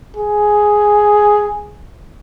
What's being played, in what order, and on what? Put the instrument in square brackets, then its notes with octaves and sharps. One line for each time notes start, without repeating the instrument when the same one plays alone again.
[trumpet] G#4